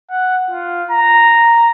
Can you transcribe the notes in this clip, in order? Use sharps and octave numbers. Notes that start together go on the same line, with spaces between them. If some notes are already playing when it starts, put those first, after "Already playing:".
F#5
F4
A#5